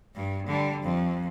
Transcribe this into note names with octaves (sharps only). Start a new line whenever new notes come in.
G2
D3 G3
F2